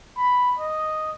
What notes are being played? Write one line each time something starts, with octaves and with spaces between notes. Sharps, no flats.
B5
D#5